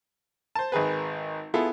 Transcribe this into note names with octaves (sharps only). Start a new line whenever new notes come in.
C5 A5
G#1 D#3 G#4 B4
B3 E4 F4 G#4 A4